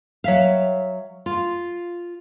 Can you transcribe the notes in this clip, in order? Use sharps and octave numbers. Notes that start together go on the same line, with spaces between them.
F#3 E5 F5
F4